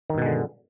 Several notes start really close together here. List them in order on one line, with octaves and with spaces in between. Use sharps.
D#3 G2 B2 G#3 D3